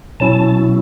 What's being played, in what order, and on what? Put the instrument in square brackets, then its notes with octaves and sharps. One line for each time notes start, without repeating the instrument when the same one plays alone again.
[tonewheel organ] B2 F#3 C#4 E4 A5